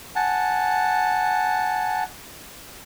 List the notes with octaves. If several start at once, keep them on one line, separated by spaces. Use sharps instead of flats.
F#5 G#5 A5